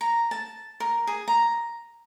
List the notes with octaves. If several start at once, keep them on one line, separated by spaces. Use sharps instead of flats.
A#5
A5
A#4
G#4
A#5